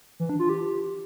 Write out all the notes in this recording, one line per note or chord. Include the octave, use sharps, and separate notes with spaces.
E3
D4
F4
G4